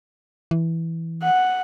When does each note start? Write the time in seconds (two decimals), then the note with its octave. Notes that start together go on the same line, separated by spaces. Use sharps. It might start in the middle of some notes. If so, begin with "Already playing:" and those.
0.51 E3
1.23 F#5